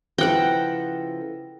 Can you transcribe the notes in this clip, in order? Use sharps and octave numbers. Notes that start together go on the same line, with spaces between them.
C#3 F3 E4 A4 B4 F#5 G5 A#6